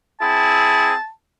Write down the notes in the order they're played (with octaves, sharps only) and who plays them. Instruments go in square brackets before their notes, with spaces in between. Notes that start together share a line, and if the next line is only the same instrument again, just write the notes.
[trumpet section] C4 E4 G#4 [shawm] A5